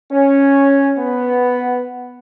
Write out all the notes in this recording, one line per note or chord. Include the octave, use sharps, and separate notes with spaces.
C#4
B3